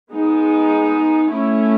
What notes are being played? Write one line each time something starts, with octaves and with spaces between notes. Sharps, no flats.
G#3 B3 D#4
A3 C#4 E4